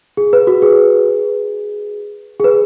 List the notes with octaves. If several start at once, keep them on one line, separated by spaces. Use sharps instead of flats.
G#4
B4
F#4
G#4
G#4
B4